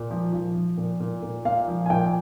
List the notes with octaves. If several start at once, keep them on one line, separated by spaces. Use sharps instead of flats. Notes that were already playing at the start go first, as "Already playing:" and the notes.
Already playing: A#2
F3
F3
F3
A#2
A#2
A#2
A#2 F5
F3
G#5
A#2 G5